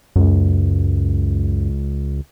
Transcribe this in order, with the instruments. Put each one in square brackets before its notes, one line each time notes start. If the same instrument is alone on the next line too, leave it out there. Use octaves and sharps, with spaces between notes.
[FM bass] C#2 [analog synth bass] F#2